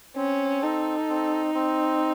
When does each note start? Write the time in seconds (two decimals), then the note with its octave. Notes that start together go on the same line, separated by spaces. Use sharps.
0.16 C4 C#4
0.62 D#4 A4
1.09 C4
1.55 C4